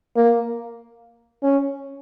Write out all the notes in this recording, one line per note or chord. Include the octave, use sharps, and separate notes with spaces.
A#3
C#4